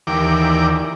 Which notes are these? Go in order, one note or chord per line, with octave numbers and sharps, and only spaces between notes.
D#2 E3 G4 A#4 D5 D6